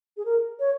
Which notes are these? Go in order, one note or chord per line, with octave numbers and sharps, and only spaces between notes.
G#4
A#4
C#5